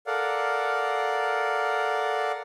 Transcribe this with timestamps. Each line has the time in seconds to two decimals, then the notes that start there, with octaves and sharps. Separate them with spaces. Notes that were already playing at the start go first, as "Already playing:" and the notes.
0.07 A4 A#4 D5 F5 F#5